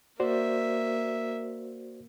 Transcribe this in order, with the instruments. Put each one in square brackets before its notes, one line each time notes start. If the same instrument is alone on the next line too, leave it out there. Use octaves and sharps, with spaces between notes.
[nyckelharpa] A#3 E5 [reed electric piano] F#4 C5 D5